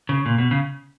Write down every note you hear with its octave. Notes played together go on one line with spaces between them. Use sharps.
C#3
A#2
B2
C#3